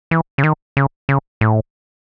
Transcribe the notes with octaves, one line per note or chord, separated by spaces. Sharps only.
E3
C#3
D#3
C#3
C#3
A2